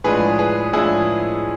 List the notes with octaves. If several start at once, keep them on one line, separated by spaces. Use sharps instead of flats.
A2 F3 G#3 D4 G#4 B4
G#4 B4
A2 F3 G#3 D4 E4 G#4